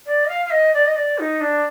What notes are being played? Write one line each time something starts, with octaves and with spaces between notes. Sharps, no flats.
D5
D#5
F5
F5
D#5
D5
D#5
D5
D#4
D4